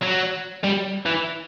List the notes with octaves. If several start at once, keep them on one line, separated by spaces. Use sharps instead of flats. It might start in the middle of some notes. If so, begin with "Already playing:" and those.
F#3
G3
E3